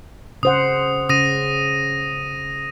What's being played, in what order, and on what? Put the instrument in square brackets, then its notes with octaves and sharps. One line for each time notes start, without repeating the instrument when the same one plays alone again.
[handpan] C#3 C5 F#5 [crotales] D#6
[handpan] C#3 [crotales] D#6 A#6 D#7